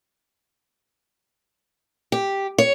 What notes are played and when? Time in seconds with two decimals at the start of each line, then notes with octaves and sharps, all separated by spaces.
2.12 G4
2.58 C#5